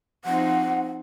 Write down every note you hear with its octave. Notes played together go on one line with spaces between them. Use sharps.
F3 C4 D#4 F#5